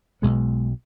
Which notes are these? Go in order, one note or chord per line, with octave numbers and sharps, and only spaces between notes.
B1 B2 G#3 B3